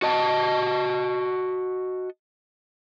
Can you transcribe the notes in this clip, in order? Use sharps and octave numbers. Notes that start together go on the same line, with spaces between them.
F#4 D#5 A5